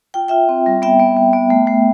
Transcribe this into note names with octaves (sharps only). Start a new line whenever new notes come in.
F4 G5
F4 E5 G5
C4
G3
B3 E5 G5
B3
B3
B3
A3
A3